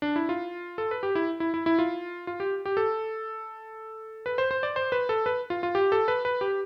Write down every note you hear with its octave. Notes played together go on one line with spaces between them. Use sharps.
D4
E4
F4
A4
B4
G4
E4
E4
E4
E4
F4
F4
G4
G4
A4
B4
C5
C5
D5
C5
B4
A4
B4
F4
F4
G4
A4
B4
B4
G4